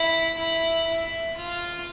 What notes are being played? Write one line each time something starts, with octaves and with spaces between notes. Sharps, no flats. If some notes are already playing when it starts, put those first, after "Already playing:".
Already playing: E4
E4
E4
F4